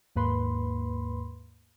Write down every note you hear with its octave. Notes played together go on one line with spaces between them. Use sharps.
D#2 G#2 A#3 B4 B5 C6